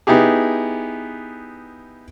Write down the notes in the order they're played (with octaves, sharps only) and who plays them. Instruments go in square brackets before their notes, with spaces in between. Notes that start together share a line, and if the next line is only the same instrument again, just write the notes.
[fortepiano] B3 D#4 E4 G4 G#4